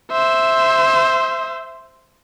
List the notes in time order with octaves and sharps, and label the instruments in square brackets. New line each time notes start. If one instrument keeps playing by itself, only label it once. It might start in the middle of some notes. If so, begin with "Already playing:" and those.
[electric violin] C5 E5